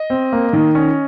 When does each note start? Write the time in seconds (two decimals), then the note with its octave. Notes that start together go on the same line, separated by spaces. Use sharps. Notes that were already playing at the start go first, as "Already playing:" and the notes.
Already playing: D#5
0.10 C4
0.33 A#3
0.53 D#3
0.75 C#4